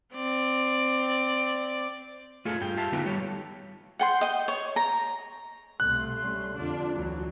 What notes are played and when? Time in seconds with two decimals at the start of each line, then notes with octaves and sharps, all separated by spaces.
0.14 C4 D5
2.45 A3 F4 G#4 A4
2.61 G2 F4 G5
2.77 F4 G4 E5 F5 A5
2.92 D3 A3 B3 D#4 F4 G4
3.06 G3 G4 A4 C#5
3.99 F#5 G5 C6
4.21 D#5 G5
4.48 C#5
4.76 A#5
5.80 C2 B2 A3 C6 F#6
6.21 G3 C#4
6.56 F2 D3 D4 F4
6.95 D2 E3 F#3